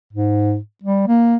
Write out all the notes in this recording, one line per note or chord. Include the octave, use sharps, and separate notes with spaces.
G#2
G3
A#3